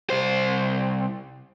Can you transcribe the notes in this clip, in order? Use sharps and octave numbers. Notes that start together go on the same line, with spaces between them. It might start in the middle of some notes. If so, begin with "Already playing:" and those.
C2 C5